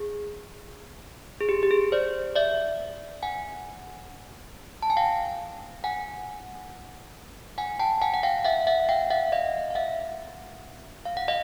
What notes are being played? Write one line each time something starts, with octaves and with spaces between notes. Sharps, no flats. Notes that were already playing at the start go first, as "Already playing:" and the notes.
Already playing: G#4
G#4
G4
G4
G#4
C5 D5
D5 E5
F#5 G#5
A5
G#5
F5 G5
F#5 G#5
F#5 G#5
G5 A5
F#5 G#5
F#5
F5 G5
E5 F#5
E5 F#5
F5 G5
E5 F#5
D#5 F5
F5
E5 F#5
F5
F#5
D#5 F5